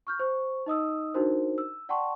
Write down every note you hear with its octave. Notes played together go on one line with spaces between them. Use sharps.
C#6 F6 G6
C5 C#6
D#4 D#5 D#6 E6
D4 D#4 F#4 A#4 C5
E6
D5 F#5 G5 A5 C6 C#6